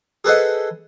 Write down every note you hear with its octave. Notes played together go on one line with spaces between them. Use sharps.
G#4 A4 B4 C5 D#5 F#5